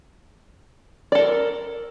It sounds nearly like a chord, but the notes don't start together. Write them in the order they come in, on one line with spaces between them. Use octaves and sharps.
D5 A4 A#4